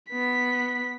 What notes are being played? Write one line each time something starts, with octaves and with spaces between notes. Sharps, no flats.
B3 B6